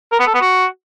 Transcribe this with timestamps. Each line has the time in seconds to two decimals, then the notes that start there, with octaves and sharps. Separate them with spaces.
0.12 A#4
0.20 B3
0.27 A4
0.34 B3
0.42 F#4